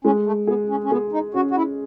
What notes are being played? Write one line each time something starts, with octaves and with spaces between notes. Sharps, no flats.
G#3 C#4
A3
B3 G#4
C#4
C#4
B3 G#4
D#4
C#4 F#4
F#4
E4